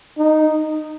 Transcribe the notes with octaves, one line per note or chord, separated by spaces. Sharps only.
D#4